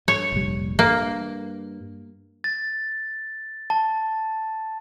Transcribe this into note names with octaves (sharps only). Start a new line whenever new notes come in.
G2 C#5
F1 A#1 G3
G2 A#3
A6
A5